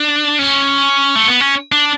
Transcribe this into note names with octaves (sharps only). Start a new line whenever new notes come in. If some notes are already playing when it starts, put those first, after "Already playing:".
Already playing: D4
C#4
A3
B3
C#4
D4